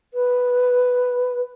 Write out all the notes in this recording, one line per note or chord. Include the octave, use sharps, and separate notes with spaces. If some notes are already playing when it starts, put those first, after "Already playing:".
B4